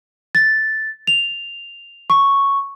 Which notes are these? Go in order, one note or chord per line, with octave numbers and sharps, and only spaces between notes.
A6
F7
C#6